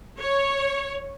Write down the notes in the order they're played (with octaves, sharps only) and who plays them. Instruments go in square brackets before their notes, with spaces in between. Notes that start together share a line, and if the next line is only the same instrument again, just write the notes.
[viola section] C#5